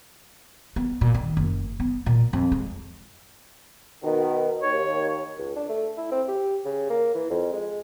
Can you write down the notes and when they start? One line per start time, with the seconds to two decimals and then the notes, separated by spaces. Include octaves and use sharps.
0.76 B3
1.01 A#2
1.14 D#3
1.37 F#1
1.80 B3
2.06 A#2
2.33 F2
2.52 G#3
4.04 B2 D#3
4.62 D#2 C#5
5.38 C#2
5.56 D4
5.69 A3
5.97 E4
6.11 C4
6.28 G4
6.65 C#3
6.89 A#3
7.15 E3
7.30 F2
7.53 G#3